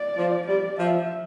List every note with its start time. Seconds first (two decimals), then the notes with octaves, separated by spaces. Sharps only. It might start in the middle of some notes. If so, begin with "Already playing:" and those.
Already playing: D5
0.16 F3
0.47 G3 D5
0.78 F3 E5